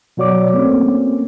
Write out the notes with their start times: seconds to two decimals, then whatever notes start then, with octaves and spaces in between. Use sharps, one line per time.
0.17 B2 F#3 F#4 C#5 D5 D6
0.53 A3 A#3 C4 C#4